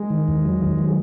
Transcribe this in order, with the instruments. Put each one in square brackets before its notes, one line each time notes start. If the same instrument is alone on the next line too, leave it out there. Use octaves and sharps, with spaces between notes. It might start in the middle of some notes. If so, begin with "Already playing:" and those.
Already playing: [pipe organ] G#3
[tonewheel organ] D#3
E2
F#3
D#3
F#3